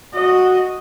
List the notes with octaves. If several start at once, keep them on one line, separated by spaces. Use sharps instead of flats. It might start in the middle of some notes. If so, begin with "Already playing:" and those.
F#4 D#5